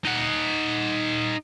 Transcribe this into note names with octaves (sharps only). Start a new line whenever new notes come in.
D#4 F#5